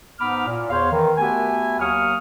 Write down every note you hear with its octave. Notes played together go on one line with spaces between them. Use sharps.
G#2 B3 D#4 B5 D6 F6
A#2
E2 C5 C#5 F5
D#3 E3
A3 B3 F#4 G4 E5 G#5
D#2 F#3 A#3 C#6 D#6 F6